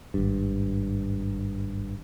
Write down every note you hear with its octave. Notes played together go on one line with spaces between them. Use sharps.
G#1 G2